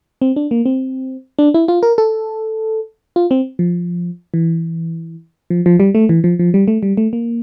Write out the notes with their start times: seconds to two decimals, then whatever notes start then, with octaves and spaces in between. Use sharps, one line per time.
0.21 C4
0.36 D4
0.51 A#3
0.66 C4
1.39 D4
1.54 E4
1.68 F4
1.83 A#4
1.98 A4
3.16 F4
3.31 C4
3.59 F3
4.34 E3
5.50 F3
5.66 F3
5.80 G3
5.95 A3
6.09 E3
6.24 F3
6.39 F3
6.54 G3
6.68 A3
6.83 G3
6.97 A3
7.13 A#3